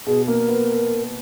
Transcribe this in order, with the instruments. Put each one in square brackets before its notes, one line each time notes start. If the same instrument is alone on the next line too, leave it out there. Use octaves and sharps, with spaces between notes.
[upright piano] B2 [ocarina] G#4
[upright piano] A#3 [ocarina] A#4
[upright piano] B3